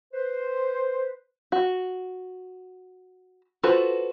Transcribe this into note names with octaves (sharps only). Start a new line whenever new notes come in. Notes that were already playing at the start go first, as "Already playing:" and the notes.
B4 C5
F#4
F4 F#4 A4 B4 C5